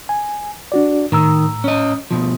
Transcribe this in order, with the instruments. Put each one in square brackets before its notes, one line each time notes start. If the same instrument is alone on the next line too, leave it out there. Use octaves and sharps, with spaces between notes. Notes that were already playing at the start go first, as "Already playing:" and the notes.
[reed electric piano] G#5
D4 F#4 D5
[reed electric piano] A2 A#5 E6 [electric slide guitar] D#3
[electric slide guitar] C#4 D#5
B2 F3